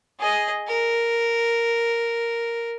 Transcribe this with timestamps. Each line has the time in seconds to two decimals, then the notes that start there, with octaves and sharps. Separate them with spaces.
0.20 G#4 D#5
0.68 A#4